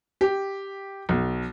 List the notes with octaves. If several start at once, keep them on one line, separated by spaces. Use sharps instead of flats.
G4
B1